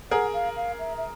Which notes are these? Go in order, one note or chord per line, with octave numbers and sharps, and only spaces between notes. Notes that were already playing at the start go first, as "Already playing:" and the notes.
G#4 A#4 F#5
F5
F5
E5
E5